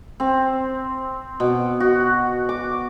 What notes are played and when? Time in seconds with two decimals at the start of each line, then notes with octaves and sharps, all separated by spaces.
0.20 C4
1.40 B2
1.80 F#4
2.49 D6